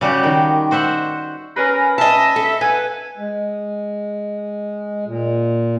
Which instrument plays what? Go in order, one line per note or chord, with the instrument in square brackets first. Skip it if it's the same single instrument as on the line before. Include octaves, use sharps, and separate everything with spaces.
[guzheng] C#3 G3 F#4 G4
D#3
F#4 C5 E5 F#5
[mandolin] C#4 G#4 B4 [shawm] A#4
[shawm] A#4
[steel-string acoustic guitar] D#5 A5 [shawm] E5
[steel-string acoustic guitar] A4
[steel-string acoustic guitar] B4 [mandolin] F#5 G#5
[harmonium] G#3
A#2